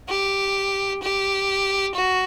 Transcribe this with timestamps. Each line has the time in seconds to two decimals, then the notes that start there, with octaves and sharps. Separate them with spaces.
0.09 G4
1.02 G4
1.95 F#4